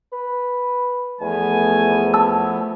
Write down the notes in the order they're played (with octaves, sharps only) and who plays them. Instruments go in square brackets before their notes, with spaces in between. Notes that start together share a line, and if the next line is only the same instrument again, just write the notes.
[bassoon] B4
[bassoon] E2 [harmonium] F3 A3 B3 [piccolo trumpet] G#5
[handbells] A5 E6